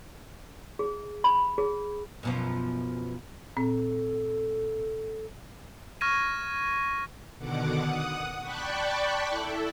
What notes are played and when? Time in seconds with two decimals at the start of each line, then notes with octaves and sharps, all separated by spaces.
0.79 G#4
1.24 B5
1.58 G#4
2.23 F#2 B2 F3
3.57 A#2 C4 A4
6.01 C#6 F6 G#6 A#6 D#7
7.38 B2 D3 D#3 F#5 D6
7.77 F#5 D#6
8.40 D5 G5 A5 B5 C#6 F#6
9.30 E4 A4